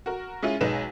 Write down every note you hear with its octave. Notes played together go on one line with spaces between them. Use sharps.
F#4 A#4
G#3 C#4 E4 F4
B1 G#3 D#4 B4 E7